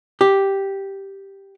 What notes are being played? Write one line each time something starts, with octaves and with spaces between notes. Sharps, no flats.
G4